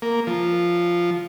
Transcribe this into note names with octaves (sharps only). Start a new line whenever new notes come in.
A#3
F3